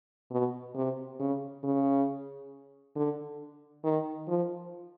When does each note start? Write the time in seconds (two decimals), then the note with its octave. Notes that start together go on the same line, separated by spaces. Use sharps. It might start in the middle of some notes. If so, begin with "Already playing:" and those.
0.31 B2
0.75 C3
1.20 C#3
1.64 C#3
2.96 D3
3.84 D#3
4.28 F3